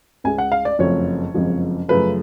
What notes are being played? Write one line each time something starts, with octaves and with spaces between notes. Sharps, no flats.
C#2 C#3 G#3 G#5
F#5
F5
D5
F#1 F2 F3 A3 C#5
F#1 F2 F3 G#3
F#2 C#3 F3 A3 B4